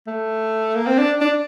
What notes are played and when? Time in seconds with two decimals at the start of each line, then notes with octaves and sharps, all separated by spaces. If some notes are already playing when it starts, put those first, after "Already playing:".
0.07 A3
0.75 A#3
0.87 C4
0.99 D4
1.21 D4